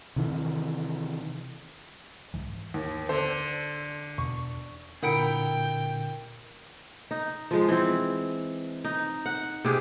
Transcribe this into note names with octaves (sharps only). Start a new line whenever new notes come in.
C3 D#3 E3
C2 G#2 E3
D#2
D3 A4 C5
E2 B2 C#6
A#2 D3 E4 A#4 F#5 G5 A#5 D7
D#4
F3 G#3
E3 C4
D#4
F#5
C3 G4 G#4